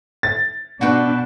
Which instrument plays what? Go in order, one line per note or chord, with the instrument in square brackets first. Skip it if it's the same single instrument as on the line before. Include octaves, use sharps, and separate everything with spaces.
[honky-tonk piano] A6
[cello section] B2 D4 [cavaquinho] F#4 B4 G5